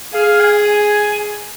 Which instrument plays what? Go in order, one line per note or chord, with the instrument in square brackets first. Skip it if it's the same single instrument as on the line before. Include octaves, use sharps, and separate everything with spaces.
[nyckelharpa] G#4 [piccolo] F5
[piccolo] G#5
G#5